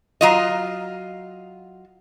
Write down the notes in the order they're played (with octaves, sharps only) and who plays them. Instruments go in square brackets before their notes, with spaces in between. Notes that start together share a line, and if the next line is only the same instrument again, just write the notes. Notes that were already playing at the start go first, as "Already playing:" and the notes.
[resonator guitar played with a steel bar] F#3 F4 D#5